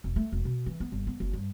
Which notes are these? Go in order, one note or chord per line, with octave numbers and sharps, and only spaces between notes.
E1
A3
E1
B2
E3
B3
G1
B3
F#1
G2